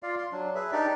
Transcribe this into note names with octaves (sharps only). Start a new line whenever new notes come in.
F4 D5 F5
C6
F#3 D4
G#4 B4 E5
D4 D#4 G4 D5